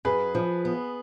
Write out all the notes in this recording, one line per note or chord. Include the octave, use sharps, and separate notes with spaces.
F#2 G#4 B4
F3
B3